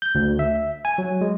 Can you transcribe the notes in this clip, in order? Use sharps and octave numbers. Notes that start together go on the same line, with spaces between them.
G6
D2
E5
G#5
F#3
G#3